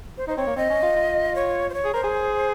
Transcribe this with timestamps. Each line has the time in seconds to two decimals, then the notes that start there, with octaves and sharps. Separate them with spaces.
0.17 C5
0.28 D#4 C5
0.37 C4 C#5
0.47 A#3
0.56 C4 D#5
0.70 C#4
0.83 F4
0.96 F4
1.35 C#5
1.70 C5
1.74 C#5
1.84 G#4
1.94 A#4 C5
2.04 G#4